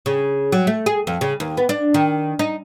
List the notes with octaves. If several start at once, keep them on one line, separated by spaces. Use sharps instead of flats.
C#3
F#3
A3
G#4
F2
C#3
D#2
B3
D4
D#3
D#4